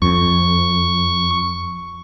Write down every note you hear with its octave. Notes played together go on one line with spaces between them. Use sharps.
F2 C#6